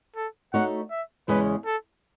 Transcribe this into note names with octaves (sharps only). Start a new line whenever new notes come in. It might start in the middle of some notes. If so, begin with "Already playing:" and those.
A4
A3 D#4 F#4 C#5 F#5
E5
E2 C#3 G#3 C#4 G#4 B4
A4